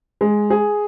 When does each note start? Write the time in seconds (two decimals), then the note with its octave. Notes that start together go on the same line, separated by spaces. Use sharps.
0.21 G#3
0.50 G#4